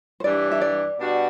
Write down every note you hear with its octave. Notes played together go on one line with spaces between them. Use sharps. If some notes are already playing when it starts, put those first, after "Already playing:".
C5
G2 E3 G3 D4 G4 D5
E5
D5
B2 G3 D4 F#4